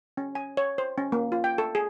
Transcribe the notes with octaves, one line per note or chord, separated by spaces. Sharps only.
C#4
G#5
C#5
C5
C#4
A#3
F4
G5
A4
G#4